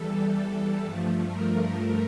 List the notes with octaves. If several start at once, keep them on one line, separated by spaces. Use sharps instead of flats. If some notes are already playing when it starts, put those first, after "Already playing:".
Already playing: E2 E3 G3 A4
G2 F3 A3
A#4